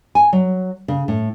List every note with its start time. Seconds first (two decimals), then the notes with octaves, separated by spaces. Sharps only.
0.15 G#5
0.33 F#3
0.88 C#3
1.08 A2